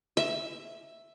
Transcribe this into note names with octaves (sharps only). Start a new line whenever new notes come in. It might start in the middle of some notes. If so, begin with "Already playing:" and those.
E5